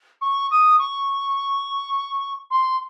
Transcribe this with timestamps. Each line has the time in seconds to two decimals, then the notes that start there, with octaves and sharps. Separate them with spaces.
0.21 C#6
0.51 D#6
0.79 C#6
2.51 C6